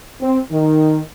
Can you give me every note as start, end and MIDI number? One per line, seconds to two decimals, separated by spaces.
0.21 0.39 60
0.51 1.00 51